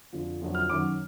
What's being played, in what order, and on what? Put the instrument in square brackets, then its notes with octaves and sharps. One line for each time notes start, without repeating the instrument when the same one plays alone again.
[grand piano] F2 D3 F3
F2 D3 F#3
F6
F#2 D#3 F#3 D6